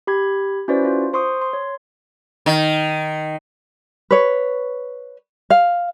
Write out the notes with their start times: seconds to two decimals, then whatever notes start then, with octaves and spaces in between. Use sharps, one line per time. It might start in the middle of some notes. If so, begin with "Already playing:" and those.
0.07 G4 B5 G#6
0.68 C#4 E4 F#4 B4 C5 D5
0.85 F4
1.13 C5 C6 C#6 D#6
1.41 C6
1.53 C#5
2.46 D#3
4.11 B4 C#5
5.50 F5